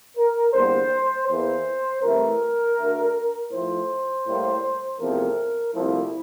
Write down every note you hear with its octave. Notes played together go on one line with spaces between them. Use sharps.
A#4
E2 D3 G3 A#3 C5
E2 E3 A#3 C5
C2 C3 E3 A3 A#4
D2 D3 A3
A2 F3 A3 C5
A2 G3 A#3
E2 C3 F3 A3 A#4
C2 A#2 F3 A3 E4